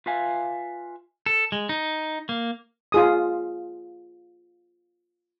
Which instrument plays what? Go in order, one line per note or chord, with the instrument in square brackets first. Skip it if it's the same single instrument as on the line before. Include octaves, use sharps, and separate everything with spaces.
[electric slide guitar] F4 B4 E5 F5 G#5
[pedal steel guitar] A4
G#3
D#4
A#3
[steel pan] F4 G#4 D#6